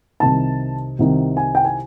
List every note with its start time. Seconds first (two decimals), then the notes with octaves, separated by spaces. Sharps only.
0.20 C2 C3 D#3 A5
0.99 C2 C3 D#3
1.37 G#5
1.55 G5
1.65 G#5